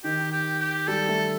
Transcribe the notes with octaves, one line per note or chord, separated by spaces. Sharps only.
D#3 G4
G4
G4
G3 A4
A3